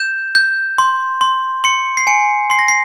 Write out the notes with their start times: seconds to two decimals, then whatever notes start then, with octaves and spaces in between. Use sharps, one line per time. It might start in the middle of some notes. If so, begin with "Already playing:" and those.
Already playing: G6 E7
0.35 G6
0.78 C6
1.21 C6
1.64 C6 C#7
1.97 C7
2.07 G#5 C#7
2.50 C6 C7
2.59 A#6
2.68 C7